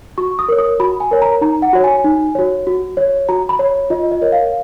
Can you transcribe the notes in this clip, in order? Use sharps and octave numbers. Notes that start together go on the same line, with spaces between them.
F#4 C#6
D#6
A#4 C#5
D#6
F#4 B5
G#5
A#4 C#5
A#5
D#4 A#5
F#5
F#4 C#5
G#5
D#4
F#4 C#5
F#4
C#5
F#4 A#5
B5
C#5
F4 D#5
D#5
A#4 C#5
F5